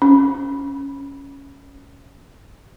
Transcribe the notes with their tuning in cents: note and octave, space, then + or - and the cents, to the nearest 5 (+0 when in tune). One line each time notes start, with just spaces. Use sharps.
C#4 +5